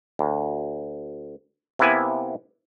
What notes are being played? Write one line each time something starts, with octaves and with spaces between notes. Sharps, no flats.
D2
C3 A#3 B3 E4 B4 G#5